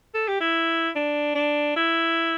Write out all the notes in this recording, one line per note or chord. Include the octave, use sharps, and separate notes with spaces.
A4
G4
E4
D4
D4
E4